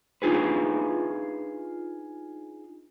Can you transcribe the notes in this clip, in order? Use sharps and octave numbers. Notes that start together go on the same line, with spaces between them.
D4 D#4 F4 G#4 B4